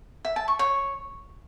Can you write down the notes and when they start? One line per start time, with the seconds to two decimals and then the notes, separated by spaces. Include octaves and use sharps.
0.25 E5
0.36 A5
0.48 C#6
0.59 C#5